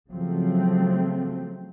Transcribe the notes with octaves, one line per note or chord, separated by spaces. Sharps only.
C#3 F3 F#3 A3 C4